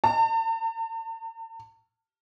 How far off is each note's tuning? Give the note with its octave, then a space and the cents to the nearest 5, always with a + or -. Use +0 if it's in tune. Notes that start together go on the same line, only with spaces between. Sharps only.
A5 +45